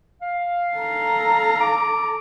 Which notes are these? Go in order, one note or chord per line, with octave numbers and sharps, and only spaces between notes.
F5
A4 A#5
D6